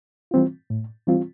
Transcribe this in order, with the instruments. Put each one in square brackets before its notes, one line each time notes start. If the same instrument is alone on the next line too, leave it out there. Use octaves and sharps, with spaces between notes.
[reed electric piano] E3 G3 C4 F4
A2
E3 G3 C4 F4